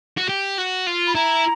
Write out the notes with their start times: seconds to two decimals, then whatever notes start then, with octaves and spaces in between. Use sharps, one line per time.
0.17 F#4
0.28 G4
0.58 F#4
0.87 F4
1.07 B5
1.15 E4 A#5